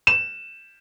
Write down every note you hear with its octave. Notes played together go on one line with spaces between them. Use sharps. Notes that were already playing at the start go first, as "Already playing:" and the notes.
E7